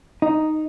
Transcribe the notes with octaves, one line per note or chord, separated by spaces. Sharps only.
D#4